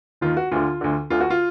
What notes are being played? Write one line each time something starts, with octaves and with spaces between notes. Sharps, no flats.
D#2 D#3 F4
F#4
D2 D3 F4
D2 D3
D2 D3 F4
F#4
F4